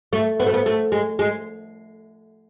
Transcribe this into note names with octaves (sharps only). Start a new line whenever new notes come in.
A3
B3
A3
B3
A3
G#3
G#3